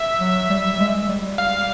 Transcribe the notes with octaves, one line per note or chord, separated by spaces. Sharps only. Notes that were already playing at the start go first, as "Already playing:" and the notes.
Already playing: E5
F#3
G3
G#3
G3
F5